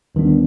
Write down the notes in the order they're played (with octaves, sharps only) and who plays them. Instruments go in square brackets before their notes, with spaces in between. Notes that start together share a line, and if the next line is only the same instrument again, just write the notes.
[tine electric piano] D#2 D#3 G3 B3 D4